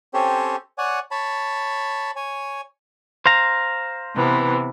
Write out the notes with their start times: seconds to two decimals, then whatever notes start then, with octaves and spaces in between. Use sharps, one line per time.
0.14 C4 C#4 G4 A4 C5 C#5
0.78 C#5 D5 F#5 G#5
1.11 C#5 A5 B5
2.16 C#5 G#5
3.26 C5 F5 A#5
4.16 C3 E3 B3